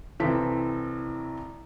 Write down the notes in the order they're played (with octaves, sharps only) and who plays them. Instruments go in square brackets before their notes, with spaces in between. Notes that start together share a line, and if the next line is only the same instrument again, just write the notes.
[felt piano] C2 E3 C4 A4 B6